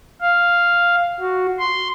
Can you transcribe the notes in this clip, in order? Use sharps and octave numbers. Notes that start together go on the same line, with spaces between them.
F5
F#4
C6